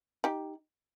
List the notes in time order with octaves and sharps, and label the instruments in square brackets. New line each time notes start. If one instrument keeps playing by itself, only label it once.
[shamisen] D#4 G4